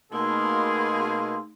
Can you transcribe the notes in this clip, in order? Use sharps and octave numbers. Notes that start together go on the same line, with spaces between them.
B2 A3 A#3 D#4 G#4 C6 E6